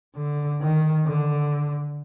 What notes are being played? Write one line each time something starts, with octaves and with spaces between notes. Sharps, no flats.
D3
D#3
D3